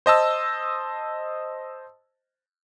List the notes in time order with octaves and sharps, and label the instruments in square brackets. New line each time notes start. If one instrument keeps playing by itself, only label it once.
[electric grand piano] C5 D#5 A5 E6